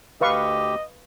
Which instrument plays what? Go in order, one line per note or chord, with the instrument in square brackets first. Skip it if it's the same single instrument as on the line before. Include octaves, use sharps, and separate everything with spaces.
[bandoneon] D2 G4 [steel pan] B4 F5 C#6 [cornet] D#5